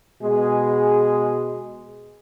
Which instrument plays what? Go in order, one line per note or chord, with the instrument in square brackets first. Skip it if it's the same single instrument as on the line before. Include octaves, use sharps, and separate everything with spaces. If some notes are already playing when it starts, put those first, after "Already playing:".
[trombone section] B2 G#3 G#4